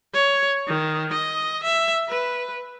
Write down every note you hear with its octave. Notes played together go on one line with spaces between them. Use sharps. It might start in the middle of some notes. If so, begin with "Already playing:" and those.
C#5
D#3
D#5
E5
B4